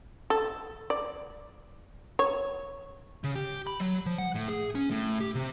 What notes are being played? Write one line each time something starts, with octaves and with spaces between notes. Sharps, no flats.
A4
D5
C#5
C#3
G4
B5
F#3
F3
F#5
A2
G#4
C#4
A2
G4
C3